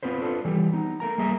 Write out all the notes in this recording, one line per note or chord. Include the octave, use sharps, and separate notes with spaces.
B3 C4 F4 B4 C5
D4 F4 A4 B4
E3 G3 G4
B3 D#4
A3 A#4 A#5
G3 A#3 G#4 E5 A#5